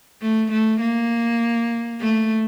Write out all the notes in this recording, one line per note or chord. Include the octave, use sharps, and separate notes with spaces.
A3
A3
A#3
A3